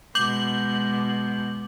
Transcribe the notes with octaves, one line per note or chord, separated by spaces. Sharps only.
B2 G#3 D6 G6 F#7